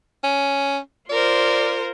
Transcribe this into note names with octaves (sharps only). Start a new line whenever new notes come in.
C#4
F4 A#4 C5 D5